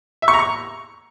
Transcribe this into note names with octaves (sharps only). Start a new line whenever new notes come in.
E5
C#6
A#5
C#6